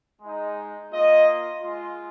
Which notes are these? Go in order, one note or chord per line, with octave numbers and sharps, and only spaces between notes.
G#3 D#4
A#3 F4 D#5
G#3 F4